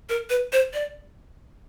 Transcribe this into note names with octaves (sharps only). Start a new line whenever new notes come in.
A#4
B4
C5
D5